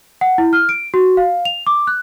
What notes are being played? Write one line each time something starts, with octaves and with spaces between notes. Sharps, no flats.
F#5
E4
F6
D7
F#4
F5
F7
D6
F#6